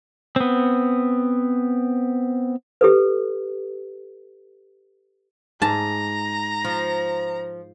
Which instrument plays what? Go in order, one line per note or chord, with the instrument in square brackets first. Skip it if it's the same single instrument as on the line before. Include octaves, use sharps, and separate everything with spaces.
[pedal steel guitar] B3 C4
[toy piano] G4 A4 B4
[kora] G#2 G#4 [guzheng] A5 [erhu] A#5
[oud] F3 [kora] F4